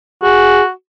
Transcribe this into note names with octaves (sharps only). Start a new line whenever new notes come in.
F#4 G#4